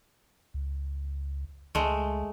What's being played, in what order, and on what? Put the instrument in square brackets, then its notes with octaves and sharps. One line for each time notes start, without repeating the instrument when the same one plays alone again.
[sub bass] C#2
[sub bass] C#2 [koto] G#3 A3